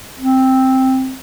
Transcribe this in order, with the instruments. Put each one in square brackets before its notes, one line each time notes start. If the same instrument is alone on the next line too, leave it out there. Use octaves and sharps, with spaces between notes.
[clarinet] C4